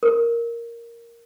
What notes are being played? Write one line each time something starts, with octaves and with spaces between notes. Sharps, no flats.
A#4